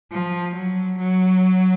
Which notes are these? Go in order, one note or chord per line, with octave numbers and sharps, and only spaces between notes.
F3
F#3
F#3